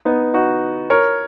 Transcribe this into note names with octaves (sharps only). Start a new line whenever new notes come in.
B3 D#4
D#4 F#4
A#4 C#5